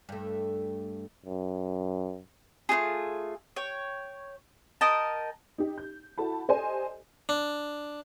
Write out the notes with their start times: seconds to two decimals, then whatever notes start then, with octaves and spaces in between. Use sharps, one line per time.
0.09 G2 A3
1.26 F#2
2.69 A3 C#4 F4 G#4
3.56 C#5 G5
4.81 A#4 D#5 G5 A5
5.58 D#4 G4
5.78 G6
6.18 E4 F#4 A4 A5 B5
6.48 G4 A4 C5 D5 D#5 G#5
7.29 D4